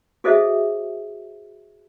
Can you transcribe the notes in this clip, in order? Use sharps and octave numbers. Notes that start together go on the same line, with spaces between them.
F#4 G#4 A4 C5 D#5 E5